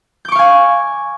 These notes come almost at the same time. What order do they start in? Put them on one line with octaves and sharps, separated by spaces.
G6 D6 C#6 F5 G#5